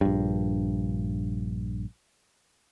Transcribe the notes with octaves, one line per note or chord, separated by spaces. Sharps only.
A#1 G2